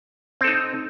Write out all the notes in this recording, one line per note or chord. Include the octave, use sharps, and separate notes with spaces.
C4 D#4 A4